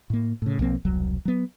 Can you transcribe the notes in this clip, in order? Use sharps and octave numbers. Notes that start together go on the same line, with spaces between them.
A2 A#3
A2 C#3
B1 F3 A#3 C4
E1 C2 F#3
F#3 B3